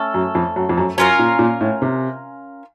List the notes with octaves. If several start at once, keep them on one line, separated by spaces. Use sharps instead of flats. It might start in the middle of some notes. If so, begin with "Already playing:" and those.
Already playing: A3 C#4 A4
F#2
F2
F#2
F2
F#2
F#2 C#4 F4 A#4 F5
A#2
A#2
A2
C3